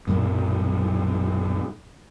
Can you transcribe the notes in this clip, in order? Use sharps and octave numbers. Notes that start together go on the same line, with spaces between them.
B1 F#2 A#2 A#3